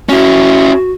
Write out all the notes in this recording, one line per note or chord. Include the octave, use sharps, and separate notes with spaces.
C#4 E4 F#4